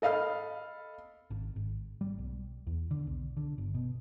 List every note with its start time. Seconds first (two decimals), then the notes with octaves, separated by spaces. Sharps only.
0.02 A4 D#5 F5 B5 F6
1.30 G#1
1.56 G#1
2.01 G3
2.18 B1
2.67 E2
2.91 D3
3.07 B1
3.37 D3
3.58 G1
3.74 B2